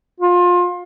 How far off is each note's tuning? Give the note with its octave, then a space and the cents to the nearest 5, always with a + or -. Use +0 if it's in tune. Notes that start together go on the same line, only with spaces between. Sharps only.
F4 +25